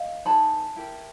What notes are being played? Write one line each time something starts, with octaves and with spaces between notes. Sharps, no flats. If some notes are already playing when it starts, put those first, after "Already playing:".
Already playing: D#5 F5
D#4 G#4 B4 A5 B5
E4 G4 A#4